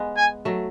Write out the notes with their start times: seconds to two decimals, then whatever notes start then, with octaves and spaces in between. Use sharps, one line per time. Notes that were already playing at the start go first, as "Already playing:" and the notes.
Already playing: G#3 B3
0.17 G#5
0.45 F#3 A3